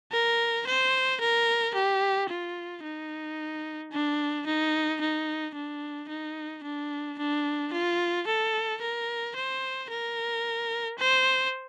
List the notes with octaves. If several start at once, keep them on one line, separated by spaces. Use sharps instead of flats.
A#4
C5
A#4
G4
F4
D#4
D4
D#4
D#4
D4
D#4
D4
D4
F4
A4
A#4
C5
A#4
C5